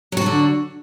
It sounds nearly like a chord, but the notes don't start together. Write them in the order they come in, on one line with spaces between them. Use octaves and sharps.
F#3 F#4 D4 D3